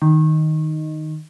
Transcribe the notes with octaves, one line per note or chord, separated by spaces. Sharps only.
D#3